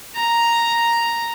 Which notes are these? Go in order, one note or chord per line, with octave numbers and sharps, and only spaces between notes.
A#5